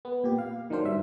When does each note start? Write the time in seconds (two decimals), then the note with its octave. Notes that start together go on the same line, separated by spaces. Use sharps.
0.05 B3
0.24 A#2 G4
0.38 F5
0.70 D#3 F#3 D4 C5
0.85 G2 E5